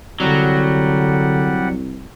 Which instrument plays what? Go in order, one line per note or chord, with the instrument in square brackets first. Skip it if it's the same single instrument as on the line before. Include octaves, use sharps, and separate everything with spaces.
[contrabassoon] C2 [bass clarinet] D3 [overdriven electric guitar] F#3 [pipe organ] G3 F#5